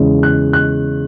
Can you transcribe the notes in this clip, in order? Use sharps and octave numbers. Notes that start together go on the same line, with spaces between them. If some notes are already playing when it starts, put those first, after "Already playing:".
Already playing: E2 C#3 G#3 C#4
F#6
F#6